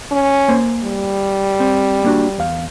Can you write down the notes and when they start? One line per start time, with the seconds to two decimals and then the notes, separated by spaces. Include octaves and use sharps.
0.11 C#4
0.48 A#3 C5 G#5
0.84 G3
1.60 C4
2.04 A#3 D4 F#4
2.38 E2 F5